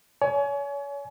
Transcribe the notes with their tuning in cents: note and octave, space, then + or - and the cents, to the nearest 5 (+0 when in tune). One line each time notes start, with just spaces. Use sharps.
C#5 +35 G#5 +30